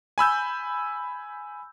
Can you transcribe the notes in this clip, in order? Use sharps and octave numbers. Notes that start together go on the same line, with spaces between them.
G#5 B5 E6 G6